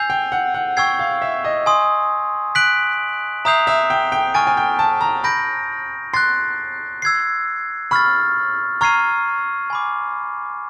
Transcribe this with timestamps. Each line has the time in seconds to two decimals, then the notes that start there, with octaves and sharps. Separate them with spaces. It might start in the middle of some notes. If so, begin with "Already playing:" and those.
Already playing: G#5 E6 G6 C7 F7
0.10 G5
0.32 F#5
0.54 F#5
0.77 G5 C#6 E6 G#6 C7
0.99 F5
1.22 E5
1.44 D#5
1.66 G#5 C6 D#6
2.55 F#6 B6 D7 F#7
3.45 E5 A#5 D#6 G6 C7 F7
3.67 E5
3.90 G5
4.12 G5
4.34 G#5 C#6 F6 A6 D7
4.47 G#5
4.57 G5
4.79 A5
5.01 A#5
5.24 B5 G6 A#6 D7
6.13 C6 F#6 A6 C7
7.02 E6 G#6 C7
7.91 B5 C#6 F6 A6
8.81 A#5 C#6 F6 G#6 C7 D#7
9.70 G#5 B5 D6